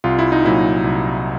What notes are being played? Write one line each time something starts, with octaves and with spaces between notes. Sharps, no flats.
C2 F4
E4
D#4
A#2 F#3 E4
C2